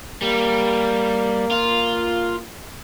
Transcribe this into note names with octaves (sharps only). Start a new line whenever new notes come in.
G3 A#3
F4